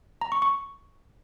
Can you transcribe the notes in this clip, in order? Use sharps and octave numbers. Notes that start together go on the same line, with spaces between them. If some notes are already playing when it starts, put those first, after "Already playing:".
A#5
C#6
C#6